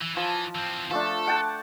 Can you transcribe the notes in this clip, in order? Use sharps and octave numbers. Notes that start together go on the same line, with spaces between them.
E3
E3 F3
E3 C4
F3 A3 D4 A4
F#5 G5 A5